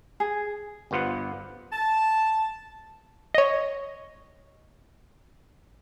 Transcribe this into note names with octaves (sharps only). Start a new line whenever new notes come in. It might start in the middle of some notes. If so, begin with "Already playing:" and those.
G#4
G1 G2 B3 F4 C5 F#5
A5
C#5 D#5